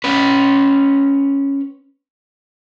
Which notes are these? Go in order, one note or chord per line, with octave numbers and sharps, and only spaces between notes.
C#4 B4